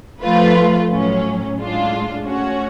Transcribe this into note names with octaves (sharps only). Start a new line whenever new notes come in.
F3 A3 F4 B4
A2 F#3 C#4
A2 G#3 D4 F4
A3 C#4 F#4 C#5